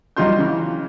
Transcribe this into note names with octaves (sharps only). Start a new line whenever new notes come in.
F#3 G3 D#4 F4 C6 G6
C#3 E3